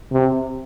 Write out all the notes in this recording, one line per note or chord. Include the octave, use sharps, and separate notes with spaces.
C3